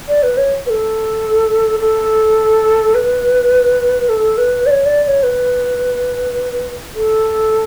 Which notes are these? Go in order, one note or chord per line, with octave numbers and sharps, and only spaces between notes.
D5
B4
C#5
B4
A4
A4
B4
A4
B4
D5
C#5
D5
D5
C#5
B4
A4